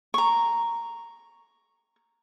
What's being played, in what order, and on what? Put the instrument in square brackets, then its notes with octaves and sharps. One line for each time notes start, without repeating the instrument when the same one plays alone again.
[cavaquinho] A#5 C#6